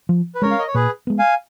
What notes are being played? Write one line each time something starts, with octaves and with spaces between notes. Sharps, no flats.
F3
B4
G#3 C#4 A#4 C#5
F5
D#5
C#5
A#2 G#4 B4
G#3 B3
F5 G#5